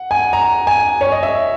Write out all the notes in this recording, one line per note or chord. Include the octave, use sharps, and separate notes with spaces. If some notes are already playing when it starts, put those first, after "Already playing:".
Already playing: F#5
G#5
A#5
G#5
C#5
D#5
E5